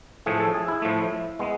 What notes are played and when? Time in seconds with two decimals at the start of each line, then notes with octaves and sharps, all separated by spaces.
0.26 A2 F3 A3 G#4
0.40 A4
0.54 G#4
0.68 E4
0.82 A2 F3 A3
1.39 G#3 B3